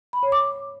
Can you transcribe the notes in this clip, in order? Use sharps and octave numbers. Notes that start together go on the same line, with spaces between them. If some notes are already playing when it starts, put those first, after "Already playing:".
B5
C#5
D6